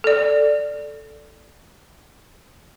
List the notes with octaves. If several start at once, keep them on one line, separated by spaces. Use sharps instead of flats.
A4 D5